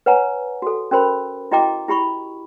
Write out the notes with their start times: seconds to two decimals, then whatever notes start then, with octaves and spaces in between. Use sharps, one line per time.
0.06 B4 C#5 F#5 G#5 A#5
0.62 F#4 A4
0.91 C#4 F#4 A#4 C5 B5
1.51 E4 F#4 D#5 G5 A#5 D6
1.88 E4 G4 B5 C#6